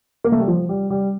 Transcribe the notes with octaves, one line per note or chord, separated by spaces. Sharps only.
A#3
A3
G3
F3
G3
G3